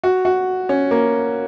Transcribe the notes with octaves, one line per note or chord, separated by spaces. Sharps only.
F#4
F#4
C#4
A#3